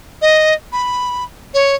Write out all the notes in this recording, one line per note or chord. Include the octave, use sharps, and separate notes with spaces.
D#5
B5
C#5